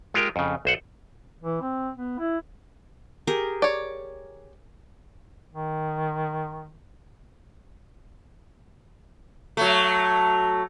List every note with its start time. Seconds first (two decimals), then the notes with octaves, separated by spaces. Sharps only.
0.14 G#3 F4 G4 A#4
0.36 F2 C#3
0.65 B1 C5 F#5
1.43 E3
1.62 C4
1.96 B3
2.19 E4
3.27 G4 G#4 A#4
3.62 C#5 D5
5.53 D#3
9.57 F#3 A3